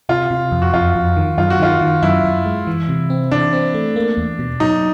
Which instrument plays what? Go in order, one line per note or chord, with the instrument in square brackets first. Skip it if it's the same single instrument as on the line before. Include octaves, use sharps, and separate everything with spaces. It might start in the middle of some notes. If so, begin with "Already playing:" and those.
[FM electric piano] C3 [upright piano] F4
[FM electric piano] C3
F2
[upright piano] F#4
[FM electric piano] F2 [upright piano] F4
[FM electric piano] F2
D#3
[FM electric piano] F#2 [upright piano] F4
[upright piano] F#4
[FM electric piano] D#3 [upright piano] F4
[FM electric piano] D#3
[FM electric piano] F#2 [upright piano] E4
[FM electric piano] F#2
G#3
E3
C3
C4
[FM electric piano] E3 [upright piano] D4
[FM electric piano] C4
A3
A#3
E2
B2
[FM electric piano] F#3 [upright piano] D#4